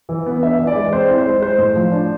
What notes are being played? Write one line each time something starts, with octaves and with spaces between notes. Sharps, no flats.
E3
B3
D4 E5
E3
D5
G#3
C4 C5
E4
C5
G#3
G#3 C5
A2
F3
D4